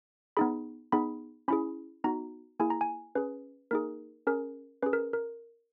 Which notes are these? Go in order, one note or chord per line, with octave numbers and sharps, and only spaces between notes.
B3 D#4 G#4 B5
B3 D#4 G#4 B5
C#4 E4 G#4 B5
B3 D#4 F#4 A#5
A#3 E4 G#4 G#5
A#5
G#5
C#4 G#4 B4
A#3 D#4 G#4 A#4
C#4 G#4 A#4
C#4 G#4 B4
A#4
A#4